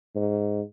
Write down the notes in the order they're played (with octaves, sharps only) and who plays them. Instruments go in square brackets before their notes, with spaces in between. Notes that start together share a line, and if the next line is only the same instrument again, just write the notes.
[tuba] G#2